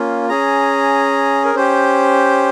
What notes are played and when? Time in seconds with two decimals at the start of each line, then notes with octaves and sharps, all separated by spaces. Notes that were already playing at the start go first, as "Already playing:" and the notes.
Already playing: A#3 C#4 F4
0.29 C#4 G#4 A#5
1.44 A#4
1.55 C#4 G4 C5